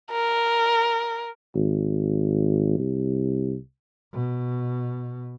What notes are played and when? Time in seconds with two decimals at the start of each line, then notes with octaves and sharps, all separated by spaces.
0.11 A#4
1.55 G#1
2.78 C2
4.13 B2